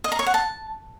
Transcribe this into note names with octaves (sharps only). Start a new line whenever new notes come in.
D#5
A#5
C#5
F#5
A5